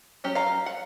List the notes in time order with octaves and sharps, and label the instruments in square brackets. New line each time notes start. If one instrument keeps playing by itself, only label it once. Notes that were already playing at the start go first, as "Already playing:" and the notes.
[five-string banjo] F#3 C#4 G4
F5 A#5
F#5